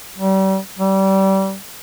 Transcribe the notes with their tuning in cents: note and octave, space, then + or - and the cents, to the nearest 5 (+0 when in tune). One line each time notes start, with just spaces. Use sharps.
G3 -35
G3 -25